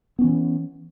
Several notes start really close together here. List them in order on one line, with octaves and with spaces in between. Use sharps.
B3 C#4 E3